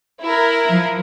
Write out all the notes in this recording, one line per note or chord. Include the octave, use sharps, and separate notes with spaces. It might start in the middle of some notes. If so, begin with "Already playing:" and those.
E4 A#4
F3